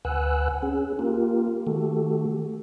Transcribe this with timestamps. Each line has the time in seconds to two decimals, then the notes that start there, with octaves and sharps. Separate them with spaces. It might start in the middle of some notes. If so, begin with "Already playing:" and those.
0.05 D2 B4 F#5 G#5 E6 F#6
0.63 C#4 G#4
0.99 A#3 F4 G4 A#4
1.67 D#3 A3 F#4 G4 A4